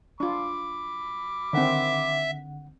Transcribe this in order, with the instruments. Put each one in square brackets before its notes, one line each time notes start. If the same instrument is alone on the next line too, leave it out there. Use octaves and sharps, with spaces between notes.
[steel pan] D4 F4 [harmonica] B5 D6
[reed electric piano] D3 F#5 [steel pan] D#3 C4 [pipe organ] E5